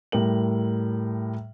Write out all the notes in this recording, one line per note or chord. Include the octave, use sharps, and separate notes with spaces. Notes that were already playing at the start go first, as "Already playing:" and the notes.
A2 G3 A#4 F#7